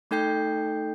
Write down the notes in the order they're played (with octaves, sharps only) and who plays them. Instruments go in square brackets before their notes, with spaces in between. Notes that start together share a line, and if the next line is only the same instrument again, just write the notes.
[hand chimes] A3 D#4 A4 G5 G6 C7